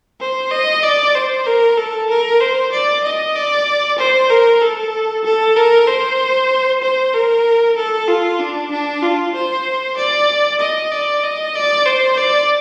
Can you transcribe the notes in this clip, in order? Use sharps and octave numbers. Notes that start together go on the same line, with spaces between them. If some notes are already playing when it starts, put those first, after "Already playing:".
C5
D#5
D5
C5
A#4
A4
A#4
C5
D5
D#5
D5
C5
A#4
A4
A4
A#4
C5
C5
A#4
A4
F4
D4
D4
F4
C5
D5
D#5
D5
D#5
D5
C5
D5